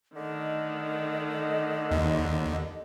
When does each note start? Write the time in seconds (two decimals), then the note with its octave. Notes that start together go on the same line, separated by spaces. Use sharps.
0.16 D3 D#3 A3 D#5
1.91 D#2